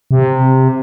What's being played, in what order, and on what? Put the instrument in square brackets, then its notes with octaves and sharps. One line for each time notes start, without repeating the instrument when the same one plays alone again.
[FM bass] C3